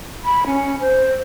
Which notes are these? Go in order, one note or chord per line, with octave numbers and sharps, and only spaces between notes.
B5
C#4
C5